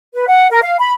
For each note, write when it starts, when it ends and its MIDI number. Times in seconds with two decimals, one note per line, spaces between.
0.14 0.28 71
0.28 0.47 78
0.50 0.59 70
0.62 0.76 77
0.79 0.92 83